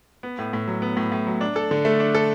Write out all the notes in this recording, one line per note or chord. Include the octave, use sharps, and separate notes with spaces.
B3
A2
A2
F#3
B3
A2
A2
F#3
D4
A4
D3
A3
D4
A4